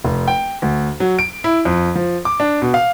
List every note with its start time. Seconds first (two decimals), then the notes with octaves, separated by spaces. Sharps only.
0.05 F1
0.28 G5
0.62 D2
1.00 F#3
1.19 D7
1.44 E4
1.65 F2
1.96 F3
2.25 D6
2.40 D4
2.62 B2
2.74 F5